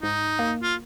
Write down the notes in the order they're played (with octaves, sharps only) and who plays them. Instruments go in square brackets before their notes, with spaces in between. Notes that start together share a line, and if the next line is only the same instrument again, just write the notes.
[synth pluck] G#2 [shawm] D#4
[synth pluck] A#3
[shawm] F4